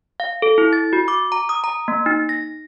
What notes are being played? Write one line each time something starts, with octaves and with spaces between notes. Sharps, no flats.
F5
A4
E4
A6
F#4
D6
A#5
D#6
A#5
A#3
D#4
A#6